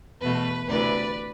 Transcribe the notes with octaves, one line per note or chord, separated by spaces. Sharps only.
E2 B2 A3 B4
D2 C3 E3 B4 D5